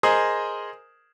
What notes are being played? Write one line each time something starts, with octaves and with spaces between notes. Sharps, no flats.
G#4 A#4 C5 D#5